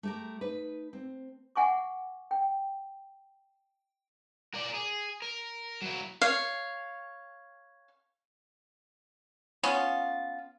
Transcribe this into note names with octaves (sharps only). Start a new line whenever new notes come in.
A3 G4 A#4
D#4 B4
C4
E5 F#5 G#5 C#6 D6
G5
A#4 D5
G#4
A#4
F#3 E4
C#5 F5
B3 C#4 F4